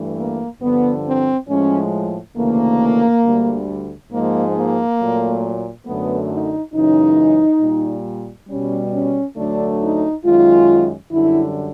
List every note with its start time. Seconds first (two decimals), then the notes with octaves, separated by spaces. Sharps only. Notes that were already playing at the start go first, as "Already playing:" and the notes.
Already playing: G2 E3 A3
0.17 A#3
0.61 G2 D3 F3 B3
1.05 C4
1.49 A2 F3 G#3 C#4
2.37 D2 C#3 E3 A3 A#3
3.24 D2 D3 G3
4.11 G#2 F3 G#3 A#3
4.55 A#3
4.99 A#2 F#3 A3
5.86 F#2 D3 F#3 A3 B3
6.30 D#4
6.74 F#2 C#3 E3 G#3 D#4
7.61 A#2 G3
8.49 B2 G3 C#4
8.93 C#4
9.36 D2 D3 F#3 A3 D4
9.81 D#4
10.24 F#2 D#3 G#3 F4
11.12 F#2 D3 G3 E4